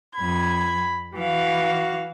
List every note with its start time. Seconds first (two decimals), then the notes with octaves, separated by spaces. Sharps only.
0.15 F2 B5 G#6
1.14 E3 F#4 F5